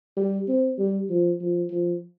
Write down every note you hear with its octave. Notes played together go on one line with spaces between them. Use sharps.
G3
C4
G3
F3
F3
F3